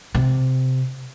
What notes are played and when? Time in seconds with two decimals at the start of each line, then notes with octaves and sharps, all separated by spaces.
0.15 C3